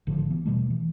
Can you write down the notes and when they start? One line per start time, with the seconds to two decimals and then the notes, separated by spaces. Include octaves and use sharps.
0.07 G#1 A2 D3 F3
0.30 E3 B3
0.46 D#1 B2 G3 A3
0.70 E3